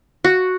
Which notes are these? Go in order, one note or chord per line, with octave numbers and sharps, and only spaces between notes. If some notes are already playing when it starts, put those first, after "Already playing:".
F#4